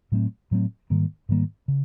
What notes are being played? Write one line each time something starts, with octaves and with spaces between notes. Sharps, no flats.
A2 F#3 A3 C4
A2 F#3 A3 C4
G#2 D#3 G3 A#3
G#2 D#3 G3 A#3
C#3